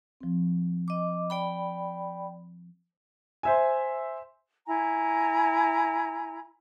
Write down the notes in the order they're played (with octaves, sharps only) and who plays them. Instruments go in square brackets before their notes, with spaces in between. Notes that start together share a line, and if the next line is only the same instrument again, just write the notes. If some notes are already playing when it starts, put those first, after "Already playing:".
[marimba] F3 C4
[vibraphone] D#5 D6
D5 G5 B5
[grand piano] C5 E5 G#5
[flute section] E4 G#5 A#5